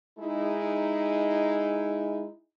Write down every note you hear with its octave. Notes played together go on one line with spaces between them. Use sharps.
G#3 D#4 E4